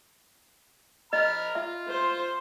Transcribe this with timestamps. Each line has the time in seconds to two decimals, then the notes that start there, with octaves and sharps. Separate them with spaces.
1.13 D#5 A#5 B5 F6
1.55 F4 E5
1.88 C5